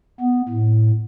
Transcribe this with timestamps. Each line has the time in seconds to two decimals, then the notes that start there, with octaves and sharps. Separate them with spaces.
0.20 B3
0.49 A2